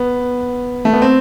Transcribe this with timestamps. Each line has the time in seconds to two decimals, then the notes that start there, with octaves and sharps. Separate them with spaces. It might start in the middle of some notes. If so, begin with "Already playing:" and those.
Already playing: B3
0.85 A3
0.93 B3
1.02 C4